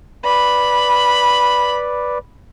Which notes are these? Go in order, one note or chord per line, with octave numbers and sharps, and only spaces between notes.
B4 D5 B5